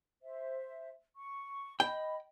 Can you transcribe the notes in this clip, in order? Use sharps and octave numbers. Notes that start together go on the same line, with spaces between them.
C5 E5
C#6
D#5 G5 B5